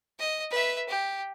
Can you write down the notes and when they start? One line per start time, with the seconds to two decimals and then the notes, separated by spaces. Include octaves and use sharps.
0.19 D#5
0.51 B4 E5
0.89 G4